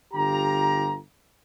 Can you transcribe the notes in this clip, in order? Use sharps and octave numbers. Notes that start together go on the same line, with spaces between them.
G1 D3 F4 G4 A#5